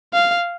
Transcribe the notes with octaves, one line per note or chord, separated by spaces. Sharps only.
F5